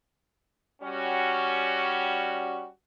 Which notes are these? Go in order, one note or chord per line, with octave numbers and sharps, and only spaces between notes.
G3 C#4 F#4